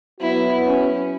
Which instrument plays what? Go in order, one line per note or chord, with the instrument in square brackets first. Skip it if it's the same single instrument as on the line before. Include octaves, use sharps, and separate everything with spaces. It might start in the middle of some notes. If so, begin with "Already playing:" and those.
[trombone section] F#3 B3 F#4 B4 [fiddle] E4
[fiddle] C#4